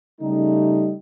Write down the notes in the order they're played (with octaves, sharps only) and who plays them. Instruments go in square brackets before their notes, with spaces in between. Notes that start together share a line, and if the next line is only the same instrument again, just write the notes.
[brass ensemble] C#3 G3 A3 D#4